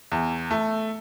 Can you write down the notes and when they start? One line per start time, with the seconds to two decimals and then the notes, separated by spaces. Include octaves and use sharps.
0.12 E2
0.51 A3